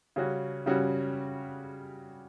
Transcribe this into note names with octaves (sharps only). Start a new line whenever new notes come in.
C#3 G3 C#4 F#4
C#3 G3 C#4 F#4